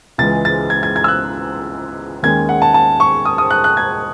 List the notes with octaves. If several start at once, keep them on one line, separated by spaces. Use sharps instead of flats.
C#2 C#3 E3 G#3 A6
A6
G#6
G#6
G#6
E6
F#6
D#2 D#3 G#3 C#4 G#6
F#5
A5
A5
C#6
D#6
D#6
F#6
F#6
G#6